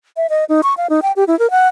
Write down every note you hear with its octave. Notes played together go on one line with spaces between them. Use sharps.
E5
D#5
D#4
C#6
F5
D#4
G5
G4
E4
A#4
F#5